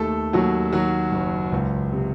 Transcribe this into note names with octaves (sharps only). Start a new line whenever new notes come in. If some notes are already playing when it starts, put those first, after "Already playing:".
Already playing: D#2 A3 A4
D#2 F#3 F#4
D#3 F#3 F#4
F#1
C#2
C3